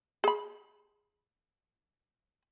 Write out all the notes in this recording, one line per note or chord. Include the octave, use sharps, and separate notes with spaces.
G#4 B5